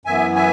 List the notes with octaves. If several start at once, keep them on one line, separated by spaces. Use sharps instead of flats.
F#2 E3 B3 E5 G#5
E5 G#5